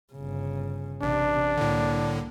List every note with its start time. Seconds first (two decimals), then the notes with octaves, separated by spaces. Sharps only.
0.13 G1 C#3
1.02 A1 C3 D4
1.57 C2 A2 D3 A#3